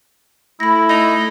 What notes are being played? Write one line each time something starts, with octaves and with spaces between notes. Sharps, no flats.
A3 E4 B5 A#6
D#4 A#6 F7